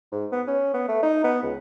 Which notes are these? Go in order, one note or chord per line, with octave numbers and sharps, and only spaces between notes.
G#2
B3
C#4
B3
A3
D#4
B3
C#2